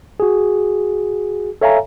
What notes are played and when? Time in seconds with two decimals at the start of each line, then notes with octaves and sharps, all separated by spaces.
0.20 F#4 G#4
1.61 A4 C#5 E5 F5 G#5 A#5